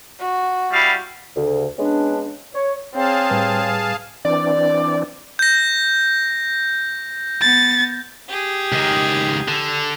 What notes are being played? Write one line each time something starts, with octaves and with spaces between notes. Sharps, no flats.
F#4
G3 E4 F5
D2 C#3
G#3 B3 C#4 D4
C#5
C4 G#4 C#5 F5 A5
A2 G3 B4
E3 C4 D4 D5
G6 A#6
B3 A6
G4 G#4
C#2 D#3
D3